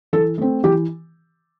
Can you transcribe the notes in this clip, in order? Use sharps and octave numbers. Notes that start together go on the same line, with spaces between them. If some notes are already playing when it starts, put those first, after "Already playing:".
E3 A4
A3 C4
E3 G4